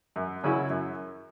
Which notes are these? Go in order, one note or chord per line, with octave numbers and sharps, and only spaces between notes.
F#2
C#3 F#3 C#4 E4
F#2